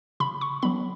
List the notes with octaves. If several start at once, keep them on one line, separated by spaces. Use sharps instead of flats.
C#3 B5
C#6
F#3 B3 B5